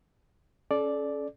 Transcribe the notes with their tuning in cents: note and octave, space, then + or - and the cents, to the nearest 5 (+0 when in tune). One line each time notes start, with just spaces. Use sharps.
C#4 +0 A4 -35 D5 +0